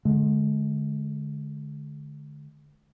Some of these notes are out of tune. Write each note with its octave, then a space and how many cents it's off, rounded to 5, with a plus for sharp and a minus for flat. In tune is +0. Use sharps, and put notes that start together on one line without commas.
D3 +0 G#3 +30